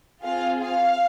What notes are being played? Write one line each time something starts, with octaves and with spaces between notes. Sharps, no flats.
C4 F4 G#4 F5
F5